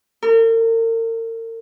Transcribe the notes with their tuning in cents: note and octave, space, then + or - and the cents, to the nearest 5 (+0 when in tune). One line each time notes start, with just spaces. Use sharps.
A#4 -40